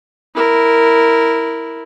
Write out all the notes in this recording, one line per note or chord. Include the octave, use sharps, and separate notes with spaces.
E4 A#4